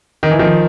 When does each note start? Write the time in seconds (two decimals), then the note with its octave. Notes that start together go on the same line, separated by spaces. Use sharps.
0.23 D#3
0.31 E3
0.39 D#3 F3